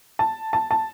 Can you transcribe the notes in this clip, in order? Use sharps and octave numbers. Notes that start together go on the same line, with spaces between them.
A5
A5
A5